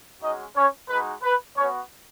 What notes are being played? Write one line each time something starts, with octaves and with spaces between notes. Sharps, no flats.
G#3 C#4 D#4 F#4 D#5
C#4 C#5
G#3 D#4 F#4 B4
B4
B3 C#4 F#4 C#5